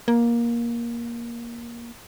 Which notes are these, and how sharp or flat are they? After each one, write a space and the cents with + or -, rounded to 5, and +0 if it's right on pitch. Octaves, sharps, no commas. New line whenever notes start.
A#3 +15